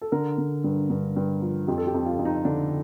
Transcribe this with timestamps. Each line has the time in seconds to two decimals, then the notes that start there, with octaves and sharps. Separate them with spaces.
0.01 A4
0.12 D3 A#4
0.38 D3
0.64 G2
0.90 G2
1.16 G2
1.42 F3
1.67 F2 G4
1.78 A4
1.87 G4
1.94 F2
2.06 F4
2.19 F2
2.25 D#4
2.45 D3 D4